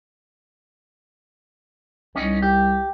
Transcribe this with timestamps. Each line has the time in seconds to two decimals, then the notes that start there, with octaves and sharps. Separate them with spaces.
2.16 C2 C#4 D#4
2.42 G4